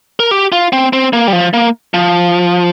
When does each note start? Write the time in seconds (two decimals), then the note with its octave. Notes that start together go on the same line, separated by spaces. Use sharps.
0.20 A#4
0.31 G4
0.52 F4
0.73 C4
0.93 C4
1.13 A#3
1.28 G3
1.33 F3
1.54 A#3
1.94 F3